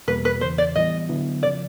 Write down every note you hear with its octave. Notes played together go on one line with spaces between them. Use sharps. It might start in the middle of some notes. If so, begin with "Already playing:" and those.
E2 B2 G3 A#3 B4
B4
E2 C#3 E3 C5
D5
A2 E3 G3 B3 D#5
D3 F#3 B3 E4
C#3 F3 D5